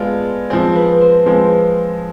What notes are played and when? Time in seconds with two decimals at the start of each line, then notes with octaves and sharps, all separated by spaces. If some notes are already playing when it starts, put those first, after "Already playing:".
Already playing: G#3 B3 F4 A4 D5
0.50 F3 G#3 C4 G#4
0.75 B4
1.01 C5
1.26 F3 G#3 C4 B4